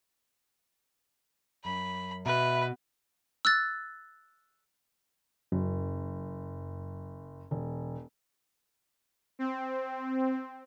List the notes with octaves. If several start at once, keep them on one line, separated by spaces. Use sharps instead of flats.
F#2 B5
B2 B4 E5 B5
E6 F#6 A6
F#1 F#2
E1
C4